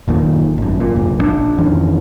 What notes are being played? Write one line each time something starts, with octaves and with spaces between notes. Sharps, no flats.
F#1 D#2 A#2 D#3
G#1 F#2
A#2
F#1 C#2
A#1 F3 D4
F2 D#3 E3 C#4